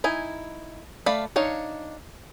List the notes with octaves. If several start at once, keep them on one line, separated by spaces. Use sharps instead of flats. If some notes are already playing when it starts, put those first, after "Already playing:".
D#4 E4 G#5
A3 D5 F5 B5
D4 D#4 C#5 F5